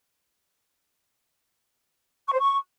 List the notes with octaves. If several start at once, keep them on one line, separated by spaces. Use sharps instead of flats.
C#6
C5
C#6